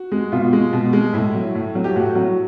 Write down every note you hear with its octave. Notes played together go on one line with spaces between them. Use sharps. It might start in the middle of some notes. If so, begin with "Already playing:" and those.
Already playing: F#4
G#3
B2 F4
G#3
B2
G#3
A2 E4
F#3
A2
F#3
G4
A2 F#4
F#3